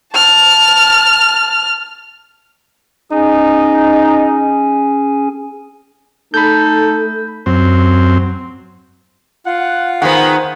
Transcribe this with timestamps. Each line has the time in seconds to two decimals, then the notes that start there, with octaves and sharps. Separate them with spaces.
0.14 A5 F6
3.12 C#4 D#4 G#4 G#5
6.34 A3 D#4 A4 B5 G6
7.46 F#2 C4
9.46 F4 F#5
10.02 D#3 B3 G#4 C5 F#5